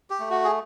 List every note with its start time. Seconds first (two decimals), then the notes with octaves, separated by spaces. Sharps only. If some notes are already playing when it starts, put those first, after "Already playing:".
0.10 G4
0.20 A3
0.30 F#4
0.44 G#4